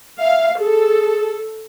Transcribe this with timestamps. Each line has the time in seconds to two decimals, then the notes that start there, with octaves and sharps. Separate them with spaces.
0.20 E5 F5
0.59 G#4 A4